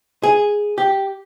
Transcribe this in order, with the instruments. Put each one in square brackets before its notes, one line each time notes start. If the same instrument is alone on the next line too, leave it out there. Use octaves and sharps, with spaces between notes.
[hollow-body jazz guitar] G#4
G4